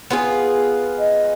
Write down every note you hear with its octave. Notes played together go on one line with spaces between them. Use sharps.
B3 F4 G#4
D#5